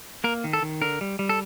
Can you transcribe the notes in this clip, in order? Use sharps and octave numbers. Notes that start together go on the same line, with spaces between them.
A#3 A#4
D#3
A4
D#3
D3 A#4
G3
G3
A4